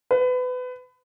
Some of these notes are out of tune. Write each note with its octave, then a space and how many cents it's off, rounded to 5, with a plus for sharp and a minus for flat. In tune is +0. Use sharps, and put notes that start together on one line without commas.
B4 +25